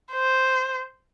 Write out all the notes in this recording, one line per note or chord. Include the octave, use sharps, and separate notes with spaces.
C5